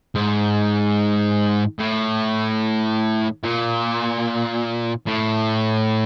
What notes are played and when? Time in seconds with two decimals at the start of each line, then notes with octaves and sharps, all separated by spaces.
0.15 G#2
1.79 A2
3.43 A#2
5.07 A2